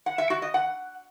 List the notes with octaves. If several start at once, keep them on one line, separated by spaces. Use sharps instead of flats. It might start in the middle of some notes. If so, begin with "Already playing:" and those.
F#5
E5
F#4
D#5
F#5